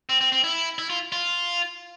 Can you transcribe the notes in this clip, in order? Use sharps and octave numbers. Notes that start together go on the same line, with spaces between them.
C4
C4
C4
E4
E4
F4
F4